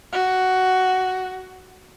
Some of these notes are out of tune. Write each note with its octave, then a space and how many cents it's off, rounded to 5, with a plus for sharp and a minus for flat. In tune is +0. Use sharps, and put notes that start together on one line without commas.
F#4 +10